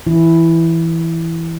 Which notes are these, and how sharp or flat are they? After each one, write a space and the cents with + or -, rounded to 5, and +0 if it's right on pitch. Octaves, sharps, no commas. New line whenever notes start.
E3 +0 E4 +0